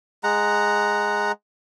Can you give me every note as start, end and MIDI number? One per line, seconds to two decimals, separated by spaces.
0.24 1.32 56
0.24 1.32 78
0.24 1.32 82